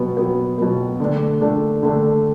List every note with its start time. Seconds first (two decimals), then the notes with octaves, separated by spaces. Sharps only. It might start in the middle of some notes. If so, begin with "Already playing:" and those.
Already playing: B2 F#3 B3
0.17 B2 F#3 B3
0.58 B2 F#3 B3
1.00 D3 A3 D4
1.41 D3 A3 D4
1.83 D3 A3 D4